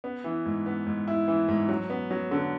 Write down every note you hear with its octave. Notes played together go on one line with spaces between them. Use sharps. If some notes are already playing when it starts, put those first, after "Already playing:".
B3
E3
G#2
B3
G#2
E4
E3
G#2
F#3
B3
F#3
D3